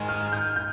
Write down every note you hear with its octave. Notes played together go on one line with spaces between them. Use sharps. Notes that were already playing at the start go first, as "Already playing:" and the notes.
Already playing: G#2 D#3 G#3
F6
G6
G6